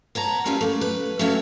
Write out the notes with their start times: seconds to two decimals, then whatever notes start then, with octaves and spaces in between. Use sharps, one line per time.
0.15 B3 C#5 A5 A#5
0.45 G3 A#3 C#4 E4 F4
0.61 A3 A#3
0.81 B4
1.19 A3 C#4 F#4 C#5 E5 F5